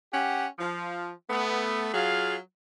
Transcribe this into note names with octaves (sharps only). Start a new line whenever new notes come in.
C#4 G4 F#5
F3
A3 B3
F#3 F4 G#4 F5